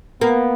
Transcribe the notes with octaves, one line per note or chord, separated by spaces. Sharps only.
A#3 B3